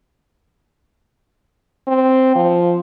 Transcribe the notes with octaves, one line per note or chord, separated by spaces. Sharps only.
C4
F3